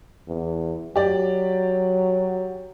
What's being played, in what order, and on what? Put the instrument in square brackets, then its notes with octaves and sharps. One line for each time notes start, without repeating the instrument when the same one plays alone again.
[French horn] E2
[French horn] F#3 [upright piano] G4 D5